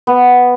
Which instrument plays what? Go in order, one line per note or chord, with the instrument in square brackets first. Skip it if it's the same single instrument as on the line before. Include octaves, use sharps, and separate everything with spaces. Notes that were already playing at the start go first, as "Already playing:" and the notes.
[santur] B3